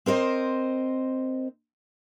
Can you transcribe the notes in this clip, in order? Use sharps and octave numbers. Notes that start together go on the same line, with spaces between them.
C4 A#4 C5 D#5